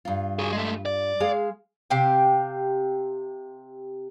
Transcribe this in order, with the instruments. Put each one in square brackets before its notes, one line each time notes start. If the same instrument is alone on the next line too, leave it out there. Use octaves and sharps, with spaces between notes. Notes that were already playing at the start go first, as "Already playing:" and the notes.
[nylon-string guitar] G2 F4
[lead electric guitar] F#4 G#4
G#3 A3
D5
[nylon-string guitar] G#3 G#4 F5
[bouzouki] C3 G4 F5 G5